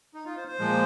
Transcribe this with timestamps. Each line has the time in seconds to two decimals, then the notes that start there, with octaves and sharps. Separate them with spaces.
0.14 D#4
0.26 F4
0.37 C5
0.48 C5
0.59 A#2 F3 G#3